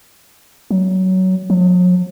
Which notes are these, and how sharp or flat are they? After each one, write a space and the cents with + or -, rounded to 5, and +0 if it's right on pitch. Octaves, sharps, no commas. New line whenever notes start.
F#3 +15
F#3 -45